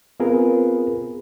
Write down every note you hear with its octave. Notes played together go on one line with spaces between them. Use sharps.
B3 C4 F4 G#4 A#4 B4